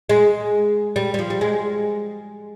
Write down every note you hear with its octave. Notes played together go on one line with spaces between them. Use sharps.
G#3
G3
G3
F3
G3
G#3